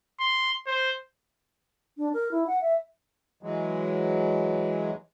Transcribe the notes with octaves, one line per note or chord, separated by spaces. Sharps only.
C6
C5
D4
A#4
E4
F#5
E5
E3 F#3 G#3